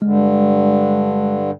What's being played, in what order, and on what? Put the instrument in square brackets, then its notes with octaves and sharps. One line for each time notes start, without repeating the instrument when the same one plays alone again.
[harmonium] G2 D3 [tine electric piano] G#3